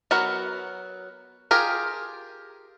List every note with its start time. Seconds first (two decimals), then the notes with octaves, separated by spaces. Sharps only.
0.11 F#3 B3 F#4 A#4 F#5
1.51 F4 G4 G#4 A#4